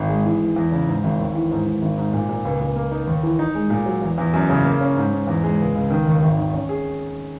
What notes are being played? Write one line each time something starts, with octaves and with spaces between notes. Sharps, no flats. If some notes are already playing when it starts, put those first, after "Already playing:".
Already playing: G#1
G#3
E3
E3
E2
C#3
G#2
G#1
D#2
E3
G#2
G#2
G#1
G#2
A#2
A#2
C#2
C#2
A#3
D#4
D#2
E3
D#4
G#3
A#2
F#3
E2
E2
F#2
C#3
A#3
C#4
G#2
G#2
E2
G#3
C#2
C#2
D#3
D#2
G#1
D#3
C#4
G#4